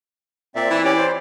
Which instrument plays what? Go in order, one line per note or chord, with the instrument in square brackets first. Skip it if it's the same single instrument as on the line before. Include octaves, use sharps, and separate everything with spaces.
[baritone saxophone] A#2 [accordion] C4 D5 E5
[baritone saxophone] E3 [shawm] E4
[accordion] C#4 G4 C#5 [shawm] D5
[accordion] C5